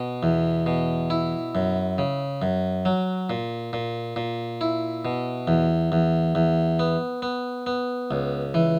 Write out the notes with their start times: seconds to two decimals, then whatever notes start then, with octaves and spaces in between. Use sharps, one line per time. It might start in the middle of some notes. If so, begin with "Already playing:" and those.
Already playing: B2
0.23 E2
0.66 B2
1.10 E4
1.55 F#2
1.98 C#3
2.42 F#2
2.85 F#3
3.30 A#2
3.73 A#2
4.16 A#2
4.61 E4
5.05 B2
5.48 E2
5.92 E2
6.35 E2
6.79 B3
7.22 B3
7.66 B3
8.11 C#2
8.54 E3